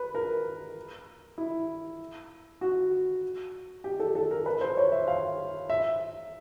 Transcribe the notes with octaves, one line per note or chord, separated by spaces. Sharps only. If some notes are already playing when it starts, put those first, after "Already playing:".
Already playing: B4
A#4
E4
F#4
G4
A4
A4
A#4
B4
C5
C#5
E5
F5
E5